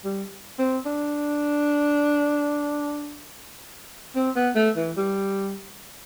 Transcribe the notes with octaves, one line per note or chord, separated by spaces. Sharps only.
G3
C4
D4
C4
B3
A3
E3
G3